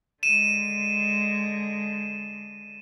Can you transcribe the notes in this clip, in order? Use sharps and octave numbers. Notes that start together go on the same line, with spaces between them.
D3 G#3 D#7 E7